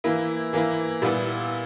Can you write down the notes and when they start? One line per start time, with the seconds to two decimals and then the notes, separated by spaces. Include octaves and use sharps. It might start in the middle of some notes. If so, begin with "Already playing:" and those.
0.04 E3 A#3 E4
0.53 E3 A#3 E4
1.02 A#2 G3 B3 E4